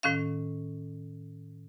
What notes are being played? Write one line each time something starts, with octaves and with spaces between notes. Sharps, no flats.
A2 D#3 C#4 F5